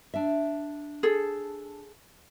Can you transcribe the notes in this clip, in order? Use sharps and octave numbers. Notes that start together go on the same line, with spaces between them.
D4 E5
G#4 A4